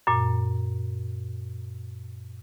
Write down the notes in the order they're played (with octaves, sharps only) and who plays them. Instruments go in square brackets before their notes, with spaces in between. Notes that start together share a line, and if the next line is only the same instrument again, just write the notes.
[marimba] F#2 A#2